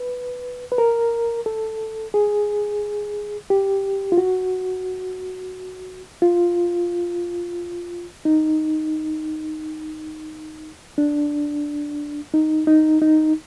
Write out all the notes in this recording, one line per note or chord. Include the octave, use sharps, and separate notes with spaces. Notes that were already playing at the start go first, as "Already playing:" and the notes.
Already playing: B4
B4
A#4
A4
G#4
G4
F4
F#4
F4
D#4
D4
D#4
D#4
D#4